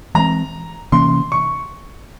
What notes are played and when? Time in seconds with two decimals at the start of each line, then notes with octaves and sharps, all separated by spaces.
0.14 E3 G#3 C4 A#5
0.92 C3 E3 A#3 C#4 C6
1.32 C#6